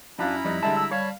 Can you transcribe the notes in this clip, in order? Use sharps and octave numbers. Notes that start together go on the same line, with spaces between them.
F#2 C#4 D4 E4 F4 A#5 B5
F2 G3 D#4
D3 G3 G#3 E5 A5
E6
G3 C#5 F5 A5 B5